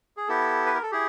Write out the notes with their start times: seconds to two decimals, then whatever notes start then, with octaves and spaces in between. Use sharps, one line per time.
0.17 G#4
0.28 B3 E4 G4 A4
0.66 B4
0.74 A#4
0.83 A4
0.92 E4 G4 G#4